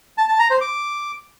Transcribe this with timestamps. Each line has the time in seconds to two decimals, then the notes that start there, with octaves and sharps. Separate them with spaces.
0.18 A5
0.29 A5
0.39 A#5
0.50 C5
0.61 D6